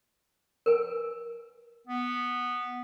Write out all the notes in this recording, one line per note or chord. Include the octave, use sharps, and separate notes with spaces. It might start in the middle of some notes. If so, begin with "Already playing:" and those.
A#4 B4 G#5
B3